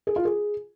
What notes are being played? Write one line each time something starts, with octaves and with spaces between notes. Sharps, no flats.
G#4
F4
G#4